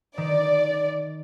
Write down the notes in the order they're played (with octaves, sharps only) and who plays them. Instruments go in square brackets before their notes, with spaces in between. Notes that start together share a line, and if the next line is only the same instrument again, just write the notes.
[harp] D#3 [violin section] D5